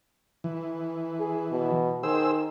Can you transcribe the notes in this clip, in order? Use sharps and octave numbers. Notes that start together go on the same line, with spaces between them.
E3
G#4
B2
D#3 G#4 C5 E6